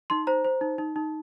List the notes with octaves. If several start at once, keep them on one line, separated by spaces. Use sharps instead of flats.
D#4 C6
C5 A#5
C5
D#4
D#4
D#4